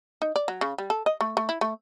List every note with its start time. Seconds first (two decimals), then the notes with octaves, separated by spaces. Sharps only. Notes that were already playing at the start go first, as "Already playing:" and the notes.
0.22 D#4
0.36 D5
0.48 F#3
0.61 C#3
0.78 G3
0.90 A4
1.06 D#5
1.21 A3
1.37 A3
1.49 E4
1.61 A3